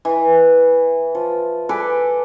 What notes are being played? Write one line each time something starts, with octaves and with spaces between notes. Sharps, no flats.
E3
F3
A4 B4 D5 G#5